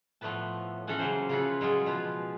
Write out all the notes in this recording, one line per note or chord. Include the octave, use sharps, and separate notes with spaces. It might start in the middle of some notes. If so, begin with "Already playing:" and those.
A2 F3 A3 B3 B4 A5
E3 C#4 A4 C#5 F#5 G#5
C#3 F#3 A#3 C5
C#3 F3 E4 F4 A4 B4
F#3 G#3 F4 G#4
B2 F3 F4 B4